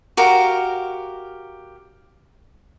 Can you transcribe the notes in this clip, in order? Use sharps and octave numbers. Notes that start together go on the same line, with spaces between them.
F#4 G4 A#4 F5